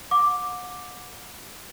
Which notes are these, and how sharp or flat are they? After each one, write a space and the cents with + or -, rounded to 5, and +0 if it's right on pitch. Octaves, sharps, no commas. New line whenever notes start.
F#5 -35 D6 +0